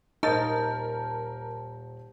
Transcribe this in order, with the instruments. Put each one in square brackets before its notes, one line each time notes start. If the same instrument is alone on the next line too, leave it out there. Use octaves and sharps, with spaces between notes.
[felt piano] D#1 C5 G6 [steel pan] D#4 [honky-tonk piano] A#4 A6 [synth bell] A5